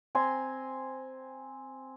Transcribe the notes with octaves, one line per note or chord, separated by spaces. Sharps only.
C4 G#5 A#5 C6